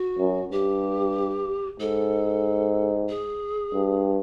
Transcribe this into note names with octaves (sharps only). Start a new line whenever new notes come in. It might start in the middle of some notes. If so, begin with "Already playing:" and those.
Already playing: F#4
F#2
G2 G4
G#2 A4
G#4
G2